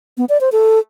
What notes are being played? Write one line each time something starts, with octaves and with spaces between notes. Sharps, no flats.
B3
D5
C5
A4